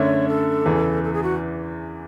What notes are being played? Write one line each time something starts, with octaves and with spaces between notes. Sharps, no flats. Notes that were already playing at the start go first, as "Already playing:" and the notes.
Already playing: F#2 D3 A3 D4 C#5
A4
E2 C#3 E3
A4
G#4
F#4